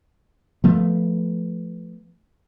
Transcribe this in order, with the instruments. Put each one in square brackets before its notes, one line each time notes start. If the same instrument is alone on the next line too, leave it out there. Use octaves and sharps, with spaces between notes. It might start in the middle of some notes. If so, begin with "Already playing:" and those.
[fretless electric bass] F3 A3 B3